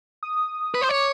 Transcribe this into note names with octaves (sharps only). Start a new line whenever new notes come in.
D#6
B4
C5
C#5 D6